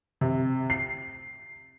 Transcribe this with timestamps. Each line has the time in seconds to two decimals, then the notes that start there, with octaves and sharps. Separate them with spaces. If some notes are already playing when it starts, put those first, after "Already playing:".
0.21 C3
0.70 C7